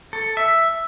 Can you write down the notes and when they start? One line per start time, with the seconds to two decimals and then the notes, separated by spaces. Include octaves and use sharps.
0.13 A4
0.37 E5